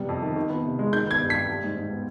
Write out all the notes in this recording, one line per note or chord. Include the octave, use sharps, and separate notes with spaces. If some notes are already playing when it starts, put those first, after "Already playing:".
Already playing: C3 G3 B3
F2
D#3
D#3
B3
C3
G#3
D#3 G6
B3 G#6
G2
G3 B6
G3
G#2
G#2
B3